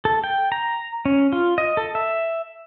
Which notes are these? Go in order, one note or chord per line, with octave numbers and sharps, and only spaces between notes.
A4
G5
A#5
C#4
F4
D#5
A4
E5